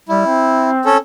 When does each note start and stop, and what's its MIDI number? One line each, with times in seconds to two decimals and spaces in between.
0.09 0.25 55
0.09 0.70 64
0.26 1.03 60
0.85 0.97 61
0.85 0.97 69